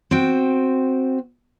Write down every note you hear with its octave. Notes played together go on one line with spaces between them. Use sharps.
C4 F#4 G5